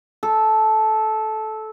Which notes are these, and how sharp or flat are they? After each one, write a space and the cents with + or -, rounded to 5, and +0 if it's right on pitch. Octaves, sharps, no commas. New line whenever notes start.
A4 -15